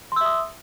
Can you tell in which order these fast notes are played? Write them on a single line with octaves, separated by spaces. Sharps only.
C6 E6 E5 D#6